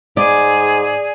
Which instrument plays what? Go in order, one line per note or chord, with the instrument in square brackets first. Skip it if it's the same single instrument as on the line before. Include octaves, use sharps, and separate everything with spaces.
[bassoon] G#2 [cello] G#4 [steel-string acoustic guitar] D5